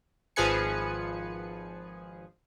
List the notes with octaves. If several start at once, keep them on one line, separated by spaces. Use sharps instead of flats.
G#1 F3 G#4 B4 G#5 C#7